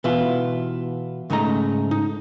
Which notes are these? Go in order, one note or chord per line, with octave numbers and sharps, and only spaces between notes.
B2 E3 B3 E4 F4
G#2 C#3 A3 D#4 A#5
D#4